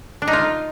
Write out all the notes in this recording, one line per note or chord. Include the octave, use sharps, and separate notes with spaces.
D4
D#4
F4